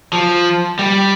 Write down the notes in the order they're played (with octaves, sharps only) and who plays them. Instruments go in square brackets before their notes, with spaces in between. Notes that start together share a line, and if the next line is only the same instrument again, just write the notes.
[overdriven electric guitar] F3
G3